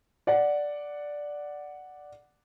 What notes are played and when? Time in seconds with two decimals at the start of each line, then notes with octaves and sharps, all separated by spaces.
0.27 D5 F#5